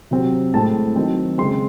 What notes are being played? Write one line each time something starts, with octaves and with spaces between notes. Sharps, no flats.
C3 F#3 C4
A2 G#3 C4 A5
D#3 F#3 C4
C#3 G#3 C4 C6